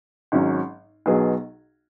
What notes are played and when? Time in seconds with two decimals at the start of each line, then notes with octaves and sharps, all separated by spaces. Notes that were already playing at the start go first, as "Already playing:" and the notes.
0.32 G#1 G#2 F#3 C#4
1.06 B1 B2 F#3 B3 G#4